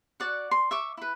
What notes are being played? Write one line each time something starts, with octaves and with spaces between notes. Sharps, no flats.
F#4 D5 F#5
C6
E5 C#6 D6
E4 B4